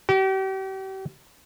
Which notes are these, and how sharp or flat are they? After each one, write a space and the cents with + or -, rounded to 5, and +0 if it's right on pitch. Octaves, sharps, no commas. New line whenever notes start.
G4 -40